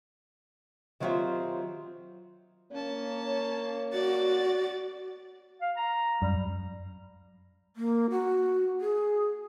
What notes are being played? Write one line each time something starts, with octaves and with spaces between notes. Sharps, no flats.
D#3 F#3 C4 F4 G4 E5
A#3 C#4 C#5 A5
F#4 D5 A6
F5
A#5
F#2 G3
A#3
F#4
G#4